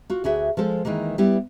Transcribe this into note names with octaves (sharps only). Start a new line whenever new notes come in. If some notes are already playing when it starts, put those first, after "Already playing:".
F4 F#4
D2 F#4 G#4 E5
F3 G#3 A4 C5
D#3 E3 G#3 A#3
G3 B3 E4 G4